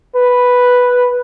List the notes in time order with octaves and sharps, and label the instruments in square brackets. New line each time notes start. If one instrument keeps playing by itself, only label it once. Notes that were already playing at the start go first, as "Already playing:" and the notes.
[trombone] B4